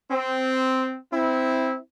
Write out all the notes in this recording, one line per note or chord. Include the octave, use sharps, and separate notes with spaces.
C4
C4 E4